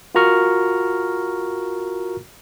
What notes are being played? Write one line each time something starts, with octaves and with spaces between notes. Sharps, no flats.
F4 F#4 A#4 A#5 C#6 F6